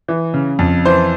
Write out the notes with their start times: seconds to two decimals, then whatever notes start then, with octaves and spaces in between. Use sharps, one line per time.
0.08 E3
0.34 C#3
0.59 F2
0.85 E3 C5